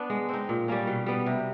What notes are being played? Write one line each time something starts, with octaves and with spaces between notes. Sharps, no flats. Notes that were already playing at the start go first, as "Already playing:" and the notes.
Already playing: B3 D4
G#3
C4 D#4
A#2
G3 A#3 C#4
B2
G3 B3
C3